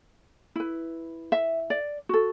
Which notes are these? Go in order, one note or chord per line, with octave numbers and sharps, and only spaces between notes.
E4 B4
E5
D5
F#4 A4